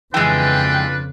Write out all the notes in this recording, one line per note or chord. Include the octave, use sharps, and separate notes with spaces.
F2 C#3 E3 G#3 D4 F4 B4 G5